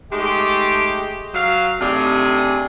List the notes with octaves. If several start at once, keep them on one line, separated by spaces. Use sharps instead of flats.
G#3 A3 D#4 G4
F#3 F5
C3 A3 D4 D#4 G#4